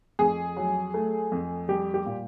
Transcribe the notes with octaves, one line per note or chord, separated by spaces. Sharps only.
F2 G#4
F#3
A3
F2
G3 G4
G4
A#2